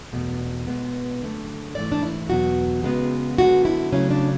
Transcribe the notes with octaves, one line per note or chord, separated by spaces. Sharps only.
E2 B2 A3
B2 G#3 B3
F#2 D3 A3
G#2 E3 A3 D5
D4
E4
E2 B2 F#3 F#4
C#3 G#3 B3
F#2 D3 G#3 B3 F#4
E4
C#3 F#3 A3 C#4
D4